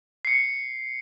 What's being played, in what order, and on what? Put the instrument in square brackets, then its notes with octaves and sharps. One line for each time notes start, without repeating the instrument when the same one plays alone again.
[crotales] C7 C#7